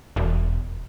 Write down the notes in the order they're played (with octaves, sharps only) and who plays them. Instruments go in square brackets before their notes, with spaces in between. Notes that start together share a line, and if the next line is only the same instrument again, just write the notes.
[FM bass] E1